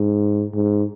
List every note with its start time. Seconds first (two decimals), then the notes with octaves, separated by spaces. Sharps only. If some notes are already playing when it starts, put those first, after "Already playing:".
Already playing: G#2
0.54 G#2